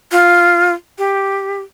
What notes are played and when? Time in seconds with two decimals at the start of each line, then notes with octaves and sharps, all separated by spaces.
0.12 F4
0.98 G4